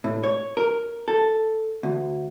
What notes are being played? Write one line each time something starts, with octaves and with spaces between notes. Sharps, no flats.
A2
C#5
A#4
A4
D2